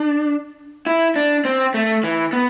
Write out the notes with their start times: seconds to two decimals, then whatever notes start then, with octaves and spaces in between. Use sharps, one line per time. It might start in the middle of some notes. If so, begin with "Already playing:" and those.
Already playing: D4
0.86 E4
1.16 D4
1.45 C4
1.74 A3
2.04 E3
2.33 B3